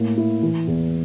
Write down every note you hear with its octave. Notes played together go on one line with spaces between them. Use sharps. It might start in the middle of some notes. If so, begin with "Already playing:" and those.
Already playing: A2 A#3
E4
E3
E2